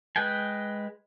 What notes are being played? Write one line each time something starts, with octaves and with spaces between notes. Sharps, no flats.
G#3 B4 G5 G#5